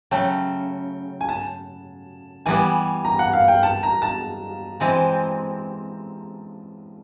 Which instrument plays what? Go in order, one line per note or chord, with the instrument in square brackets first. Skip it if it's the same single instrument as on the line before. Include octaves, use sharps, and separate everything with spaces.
[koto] C#3 F#3 A3 [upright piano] G5
[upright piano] G#5
A5
[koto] E3 G3 B3 [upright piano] G#5
[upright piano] A#5
F#5
F5
G5
A5
A#5
A5
[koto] E3 G#3 C4